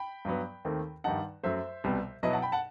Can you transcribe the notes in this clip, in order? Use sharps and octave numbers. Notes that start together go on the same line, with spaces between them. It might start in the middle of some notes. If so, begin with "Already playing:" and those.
Already playing: G5 B5
G2 F#3 B3
D#2 D#3 A3 C4
G2 D#3 G3 D#4 F#5 A5
F#2 F#3 A3 C5 E5
C2 B2 G3 B3
B2 F#3 B3 E4 B4 D#5
F#5 A5
G5 B5
F#5 A5